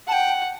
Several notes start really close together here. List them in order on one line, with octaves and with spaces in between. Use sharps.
F#5 A5 G5